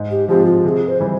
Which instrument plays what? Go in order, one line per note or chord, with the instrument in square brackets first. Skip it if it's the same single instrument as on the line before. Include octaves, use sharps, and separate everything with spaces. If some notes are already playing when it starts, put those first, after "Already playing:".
Already playing: [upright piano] G#2
[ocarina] G4
[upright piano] F3 G#3 C4 F4 [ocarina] G4
[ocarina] F4
[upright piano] C3 [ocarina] G#4
[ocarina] C5
[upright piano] E3 G3 [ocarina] C5